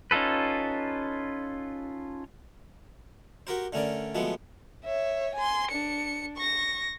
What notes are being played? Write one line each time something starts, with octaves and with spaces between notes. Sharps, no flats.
C#4 D#4 F4 A4 B4
F#4 G4 A#4 C5
D3 A3 C#4 A#4 D5
F3 F#3 G#3 A3 B3
C#5 E5
G#5 C6
D4 C#7
C#6 A#6